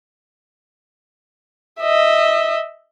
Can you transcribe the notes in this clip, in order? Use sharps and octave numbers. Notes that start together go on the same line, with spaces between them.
D#5 E5